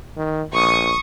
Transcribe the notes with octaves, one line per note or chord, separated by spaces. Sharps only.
D#3
A#1 C#6 D#6